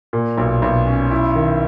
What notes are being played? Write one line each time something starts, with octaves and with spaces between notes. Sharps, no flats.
A#2
B1
B1
C#4
E4
D#3